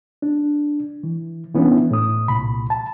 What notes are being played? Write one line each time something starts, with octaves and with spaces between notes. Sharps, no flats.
D4
E3
E3 B3 C#4 D4 E4
A2 D#6
C2 A#2 B5
A5